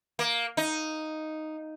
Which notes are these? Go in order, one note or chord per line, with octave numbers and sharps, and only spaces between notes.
A#3
D#4